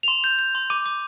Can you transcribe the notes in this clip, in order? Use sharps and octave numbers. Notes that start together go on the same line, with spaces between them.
F7
C6 E7
G6
G6
C6
D6 D#7
D6